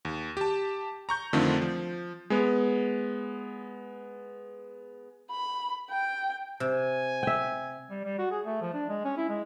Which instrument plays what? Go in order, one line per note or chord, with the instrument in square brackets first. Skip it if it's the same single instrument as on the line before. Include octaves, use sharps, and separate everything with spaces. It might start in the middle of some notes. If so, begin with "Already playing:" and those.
[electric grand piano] D#2
G4 A5
A#5 C#6 G6
F2 D3 D#3 A3 C4 F4
F3
G#3 B3
[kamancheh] B5
G5
[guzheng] C3 [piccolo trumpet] G#5
[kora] E5 G5
[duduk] G3
G3
F#4
G#4
A3
F3
D4
G#3
C#4
E4
G#3